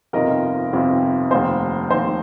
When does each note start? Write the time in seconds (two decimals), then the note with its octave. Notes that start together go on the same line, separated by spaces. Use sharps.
0.13 G1 F2 C3 D#3 A#4 D#5
0.73 G1 F2 C3 D#3
1.31 F1 D#2 D#3 C5
1.89 F1 D#2 D#3 C5